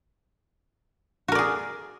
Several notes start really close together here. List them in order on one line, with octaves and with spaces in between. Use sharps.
F#4 A#4 D5 G#4